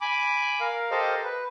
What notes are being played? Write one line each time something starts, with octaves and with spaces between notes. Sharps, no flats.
G#5 B5 D6
A#4 F5
G4 A4 A#4 C5 D#5 F5
B4